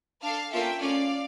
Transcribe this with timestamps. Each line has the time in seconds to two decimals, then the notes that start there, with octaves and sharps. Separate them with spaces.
0.23 D4 A4 F5 A5
0.52 A#3 C#4 F4 A4 E5 G5
0.81 A3 C#4 F4 D5 F5